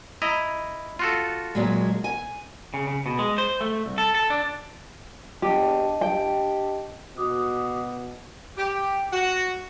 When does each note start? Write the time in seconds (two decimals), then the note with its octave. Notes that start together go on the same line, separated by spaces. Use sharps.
0.22 E4 D#5 A#5
0.99 F4 F#4 A4
1.55 A#2 F#3 G#3
2.04 G#5
2.74 C#3
2.87 C#3
3.06 B2
3.19 G#3
3.38 C5
3.61 A3
3.86 C2
3.98 A4
4.15 A4
4.30 D4
5.42 E2 D4 G4 D#5 A5
6.01 G4 G5
7.17 B2 F#4 D6 D#6
8.57 G4
9.12 F#4